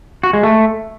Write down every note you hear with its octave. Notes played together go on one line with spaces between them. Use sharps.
F#4
G#3
A3